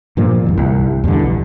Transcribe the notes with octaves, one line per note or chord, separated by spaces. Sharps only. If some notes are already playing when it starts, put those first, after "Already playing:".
G2 A#2 F3 A#3
E2 G2 D#3
C2
E2 G2 B2 D3
A#1